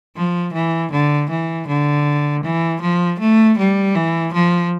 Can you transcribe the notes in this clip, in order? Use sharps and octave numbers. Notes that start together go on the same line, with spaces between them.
F3
E3
D3
E3
D3
E3
F3
A3
G3
E3
F3